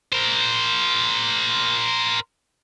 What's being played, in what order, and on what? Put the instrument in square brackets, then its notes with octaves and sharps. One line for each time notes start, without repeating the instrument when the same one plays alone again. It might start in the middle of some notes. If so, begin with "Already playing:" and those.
[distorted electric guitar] A#4 C5